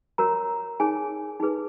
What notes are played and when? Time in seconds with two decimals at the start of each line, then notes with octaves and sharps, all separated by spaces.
0.18 F#4 A#4 C#5 A#5
0.80 D#4 G#4 C#5 G#5
1.40 D#4 G#4 B4